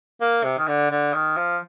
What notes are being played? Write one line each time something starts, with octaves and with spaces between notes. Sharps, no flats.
A#3
C3
D#3
D3
D3
D#3
F3